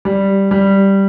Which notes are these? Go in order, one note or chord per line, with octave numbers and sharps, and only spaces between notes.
G3
G3